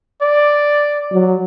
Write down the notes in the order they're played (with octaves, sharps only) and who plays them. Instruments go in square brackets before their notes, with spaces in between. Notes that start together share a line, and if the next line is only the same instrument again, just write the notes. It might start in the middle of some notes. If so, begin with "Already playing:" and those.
[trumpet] D5
[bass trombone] F#3